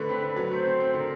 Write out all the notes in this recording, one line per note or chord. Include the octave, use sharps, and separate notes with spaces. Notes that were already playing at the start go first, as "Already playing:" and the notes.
Already playing: D3 A3 B4
C4
D3
F#3
B4
A3 C5
C4
C4
D3 A#4